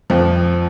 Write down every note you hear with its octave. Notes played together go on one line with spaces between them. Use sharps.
F2 F3